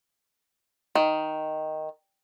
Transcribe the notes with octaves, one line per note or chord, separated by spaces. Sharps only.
D#3